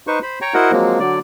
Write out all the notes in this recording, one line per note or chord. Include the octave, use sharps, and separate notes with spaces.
D#4 B4 C5 C#6
C5 B5
C#5 G5 A#5 C#6
E4 F#4 A#4 C5 D#5 F#5
F3 F#3 G#3 A#3 C4
D3 F#3 D5